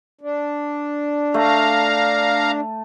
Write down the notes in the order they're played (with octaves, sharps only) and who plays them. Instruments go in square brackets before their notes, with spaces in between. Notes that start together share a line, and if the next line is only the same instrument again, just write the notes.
[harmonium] D4
[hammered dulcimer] A3 [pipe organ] F5 A#5